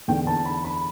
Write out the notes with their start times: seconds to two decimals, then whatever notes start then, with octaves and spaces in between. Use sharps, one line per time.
0.08 E2 D3 G5
0.27 A5
0.45 B5
0.64 B5